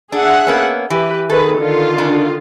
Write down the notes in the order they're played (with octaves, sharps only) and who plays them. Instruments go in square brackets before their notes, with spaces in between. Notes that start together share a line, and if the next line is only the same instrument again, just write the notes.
[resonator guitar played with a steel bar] D4 [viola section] G#4 E5 F#5
[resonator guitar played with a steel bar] A#3 B3 C#4
[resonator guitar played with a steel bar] E3 [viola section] G4 B4
[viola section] D#3 G#4 B4 [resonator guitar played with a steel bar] A4
[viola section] D3 D#3 F4
[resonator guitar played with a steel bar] C#3 D4